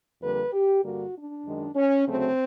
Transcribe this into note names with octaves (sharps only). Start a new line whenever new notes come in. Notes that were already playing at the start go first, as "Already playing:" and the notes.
F2 D3 G3 A#3 B4
G4
G2 D3 G3 A#3 F#4
D4
F#2 D#3 G#3
C#4
D2 C#3 F#3 A3 C4